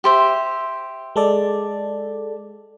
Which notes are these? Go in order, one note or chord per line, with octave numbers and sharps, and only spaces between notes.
G4 C5 E5
G#3 A4 D5